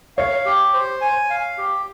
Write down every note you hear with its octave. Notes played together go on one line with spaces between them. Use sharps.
C#5 F5
G4
C5
G#5
F5
G4